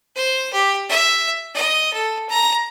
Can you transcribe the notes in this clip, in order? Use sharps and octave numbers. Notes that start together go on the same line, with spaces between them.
C5
G4
E5
D#5
A4
A#5